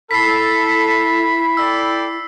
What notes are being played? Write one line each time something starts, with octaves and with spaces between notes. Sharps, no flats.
E4 A4 B5 B6 C7
A4 D5 G5 E6